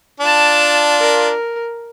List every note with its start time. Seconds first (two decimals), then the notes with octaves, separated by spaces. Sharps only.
0.20 D4 F4 D5 A5
0.99 A#4